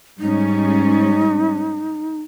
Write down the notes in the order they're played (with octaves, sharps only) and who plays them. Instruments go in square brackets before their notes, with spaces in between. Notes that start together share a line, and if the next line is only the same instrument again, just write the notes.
[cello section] G#2 G3 C#4 [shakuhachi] D#4